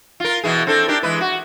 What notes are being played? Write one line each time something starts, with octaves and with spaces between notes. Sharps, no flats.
F4 A#4
B2 E3 G#4
C4 D4 A4
D4 G4 A#4
E3 G#3 B4
F#4